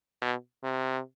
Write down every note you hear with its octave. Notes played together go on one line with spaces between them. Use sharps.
B2
C3